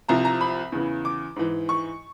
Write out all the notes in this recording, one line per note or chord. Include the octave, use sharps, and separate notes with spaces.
C2 C3 F3 A#5
A#5
B5
E2 C#3 E3
D6
G#2 E3
C#6